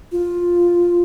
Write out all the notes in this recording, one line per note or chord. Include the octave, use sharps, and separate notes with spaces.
F4